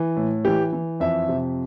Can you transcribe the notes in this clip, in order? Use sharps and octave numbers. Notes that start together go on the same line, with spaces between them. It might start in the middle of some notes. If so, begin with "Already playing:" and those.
Already playing: E3
A2
E3 G4
E3
F2 E5
C3